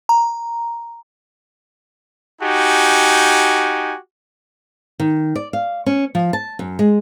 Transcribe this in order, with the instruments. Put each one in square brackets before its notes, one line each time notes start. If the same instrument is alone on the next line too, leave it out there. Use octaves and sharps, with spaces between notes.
[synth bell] A#5
[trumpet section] D#4 F#4 G4 G#5
[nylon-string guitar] D#3
D5
F5
C#4
F3
A5
F#2
G#3